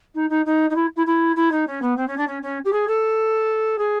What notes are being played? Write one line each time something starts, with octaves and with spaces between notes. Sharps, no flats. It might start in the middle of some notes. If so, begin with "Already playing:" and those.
D#4
D#4
D#4
D#4
E4
E4
E4
E4
D#4
C#4
B3
C4
C#4
D4
C#4
C#4
G4
G#4
A4
G#4